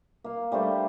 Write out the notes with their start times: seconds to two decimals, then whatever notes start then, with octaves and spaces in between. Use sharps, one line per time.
0.24 A#3 F5
0.52 G3 A3 D4 C5